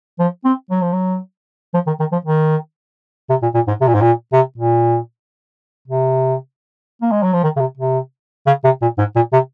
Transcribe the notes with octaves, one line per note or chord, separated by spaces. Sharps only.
F3
C4
F#3
F3
F#3
F3
D#3
D#3
F3
D#3
C3
A#2
A#2
G#2
C3
A#2
G#2
A#2
C3
A#2
C3
A#3
G#3
F#3
F3
D#3
C#3
C3
C3
C#3
C3
A#2
G#2
A#2
C3